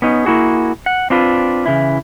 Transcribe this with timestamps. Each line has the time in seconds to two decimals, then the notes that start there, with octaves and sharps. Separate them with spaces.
0.02 B3 C#4 D#4
0.25 A#3 E4 F#4 G#4
0.86 F#5
1.10 C4 D4 F4 B4
1.66 C#3 E3 E4